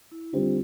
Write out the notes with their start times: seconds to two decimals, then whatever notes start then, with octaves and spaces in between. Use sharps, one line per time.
0.12 E4
0.33 D3 G3 C4 F4 G4